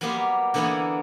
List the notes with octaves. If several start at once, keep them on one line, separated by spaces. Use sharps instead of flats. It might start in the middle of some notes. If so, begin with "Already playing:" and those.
F#3 G3 A#3 B3 G4 C6
D3 E3 A#3 B3 E4 G#4